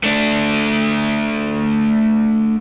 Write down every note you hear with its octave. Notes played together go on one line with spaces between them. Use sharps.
A3 D4